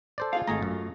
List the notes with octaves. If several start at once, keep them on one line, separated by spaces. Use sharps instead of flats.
A4 C5 D5
F4 G#4 F5
G#1 A3 F4 G#4 A4 A#5
F#2